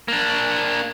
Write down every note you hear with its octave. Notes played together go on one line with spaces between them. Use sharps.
A#3 D4